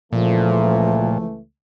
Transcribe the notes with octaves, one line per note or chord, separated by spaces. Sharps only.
C#2 A#2 E3 F3 A3